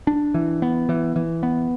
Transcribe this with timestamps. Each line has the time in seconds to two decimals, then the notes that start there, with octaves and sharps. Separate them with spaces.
0.07 D4
0.34 E3
0.62 B3
0.89 E3
1.16 E3
1.43 B3